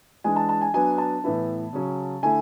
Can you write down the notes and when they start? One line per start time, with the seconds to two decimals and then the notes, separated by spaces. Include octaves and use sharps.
0.24 E3 G#3 D4 G#5
0.36 A5
0.49 A5
0.62 G#5
0.74 F#3 B3 D4 G#5
0.98 A5
1.24 A2 E3 B3 E4
1.73 C#3 F#3 C#4
2.23 D3 A3 E4 G#5